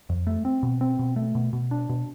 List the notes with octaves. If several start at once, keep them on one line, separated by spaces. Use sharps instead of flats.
F2
A3
C4
B2
C4
B2
A3
B2
B2
D4
B2